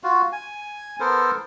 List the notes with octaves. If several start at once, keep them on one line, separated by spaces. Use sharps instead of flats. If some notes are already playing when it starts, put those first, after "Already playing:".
F4 F#4
G#5
B3 A4 A#4 C5